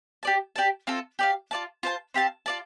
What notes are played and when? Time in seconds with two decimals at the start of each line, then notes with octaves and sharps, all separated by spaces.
0.23 G4 D5 A5
0.56 G4 D5 A5
0.87 C4 F4 A4
1.19 G4 D5 F5
1.51 F4 D5 A5
1.83 F4 C5 A5
2.14 C4 G4 F5 A5
2.46 F4 D5 A5